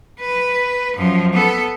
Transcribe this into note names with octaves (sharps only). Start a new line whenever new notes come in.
B4
F#2 F3
B3 A4